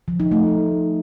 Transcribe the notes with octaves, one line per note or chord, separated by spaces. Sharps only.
F3
D#4
A3